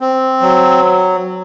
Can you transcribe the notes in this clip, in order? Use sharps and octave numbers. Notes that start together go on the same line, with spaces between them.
C4
F#3